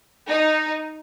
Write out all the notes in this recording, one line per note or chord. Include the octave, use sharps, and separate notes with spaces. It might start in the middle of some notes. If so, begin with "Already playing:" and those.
D#4